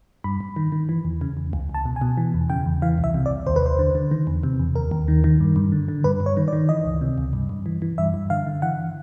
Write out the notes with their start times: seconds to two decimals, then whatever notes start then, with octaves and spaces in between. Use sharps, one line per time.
0.24 G2 B5
0.41 G2
0.56 D#3
0.72 D#3
0.89 E3
1.05 E2
1.21 C#3
1.37 E2
1.53 C#2
1.69 C#2
1.74 A5
1.85 B2
1.96 G#5
2.01 B2
2.17 E3
2.34 E2
2.50 C#3 G5
2.66 E2
2.82 E3 F5
2.98 C2
3.04 E5
3.14 C3
3.26 D5
3.31 C2
3.47 D#2 C5
3.56 B4
3.62 D#2 C5
3.79 D3
3.95 D3
4.11 D#3
4.27 E2
4.43 C3
4.59 E2
4.76 D#2 A#4
4.91 D#2
5.08 D#3
5.24 D#3
5.40 G2
5.56 G2
5.72 D3
5.88 D3
6.04 G2 B4
6.20 G2
6.26 C#5
6.37 D#3
6.48 D5
6.53 D#3
6.69 E3 D#5
6.85 C#2
7.01 C3
7.18 C#2
7.33 G2
7.49 G2
7.66 E3
7.82 E3
7.98 G2 E5
8.14 G2
8.30 D3 F5
8.47 D3
8.62 E3 F#5